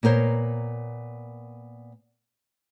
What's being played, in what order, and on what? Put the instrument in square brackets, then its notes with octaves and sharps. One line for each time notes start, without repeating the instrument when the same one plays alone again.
[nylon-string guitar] A#2 B3 A#4 C5 C#5